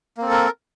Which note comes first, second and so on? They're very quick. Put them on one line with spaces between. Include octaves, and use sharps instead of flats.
A#3 C4 A4 A#4